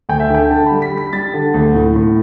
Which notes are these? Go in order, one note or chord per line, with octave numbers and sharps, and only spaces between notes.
D2 G5
E5
D3 G5
D3 A5
B5
G3
B6
G3
B6
G3 A6
D3
D2
A2
A2